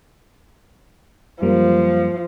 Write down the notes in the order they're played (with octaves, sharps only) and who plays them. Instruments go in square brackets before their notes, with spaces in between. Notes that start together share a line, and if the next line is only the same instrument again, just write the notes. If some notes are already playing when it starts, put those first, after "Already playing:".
[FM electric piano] F#2 G3 A#3 [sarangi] F3